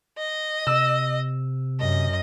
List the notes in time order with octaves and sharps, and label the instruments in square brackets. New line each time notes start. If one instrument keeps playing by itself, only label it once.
[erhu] D#5
[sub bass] C3 [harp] E6
[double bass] F#2 [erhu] D#5